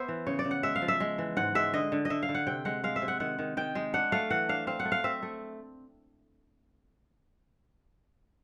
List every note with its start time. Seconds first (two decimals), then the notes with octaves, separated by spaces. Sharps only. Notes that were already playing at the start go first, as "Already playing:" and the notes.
Already playing: B3 C5 E5
0.08 E3
0.27 C#3 C#5
0.39 D5
0.45 C#3
0.51 F#5
0.63 G#3 E5
0.76 F5
0.82 F3
0.88 E5
1.00 G#3
1.18 E3
1.37 G#2 F#5
1.55 G#3 E5
1.74 D3 D#5
1.92 D3
2.05 D#5
2.10 D3 E5
2.23 F5
2.29 D3
2.35 F#5
2.47 C3 G5
2.65 G#3 F#5
2.84 G#3 F5
2.96 E5
3.02 C3
3.08 F#5
3.20 D#3 F#5
3.39 D#3
3.57 D#3 G5
3.75 G#3
3.93 D4 F#5
4.12 A3 F5
4.30 E3 F#5
4.49 D4 F5
4.67 C4 F5
4.80 F#5
4.85 A3
4.92 F5
5.04 C4 E5
5.23 A3